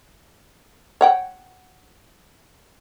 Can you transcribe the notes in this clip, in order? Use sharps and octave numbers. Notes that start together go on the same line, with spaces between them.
C#5 F#5 G5